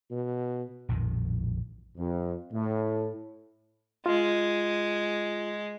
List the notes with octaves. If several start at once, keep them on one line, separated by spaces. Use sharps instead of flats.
B2
A#1 F2 A2 D#3
F2
A2
G#3 F4